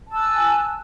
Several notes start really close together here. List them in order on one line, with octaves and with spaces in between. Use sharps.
A5 E6 F#6 G#5